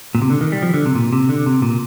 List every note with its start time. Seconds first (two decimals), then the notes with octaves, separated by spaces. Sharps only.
0.15 A#2
0.22 C3
0.30 D3
0.41 D#3
0.52 G3
0.63 F3
0.74 D3
0.86 C3
0.96 A#2
1.13 C3
1.29 D3
1.46 C3
1.62 A#2